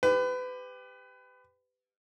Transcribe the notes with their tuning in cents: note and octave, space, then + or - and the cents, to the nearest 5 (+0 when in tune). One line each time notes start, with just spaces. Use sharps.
G4 +15 B4 +30